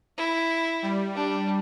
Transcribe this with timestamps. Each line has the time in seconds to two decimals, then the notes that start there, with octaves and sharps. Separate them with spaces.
0.18 E4
0.82 G3
1.15 D4